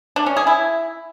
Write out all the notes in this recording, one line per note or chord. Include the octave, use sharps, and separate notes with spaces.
D4
C#4
G#4
E4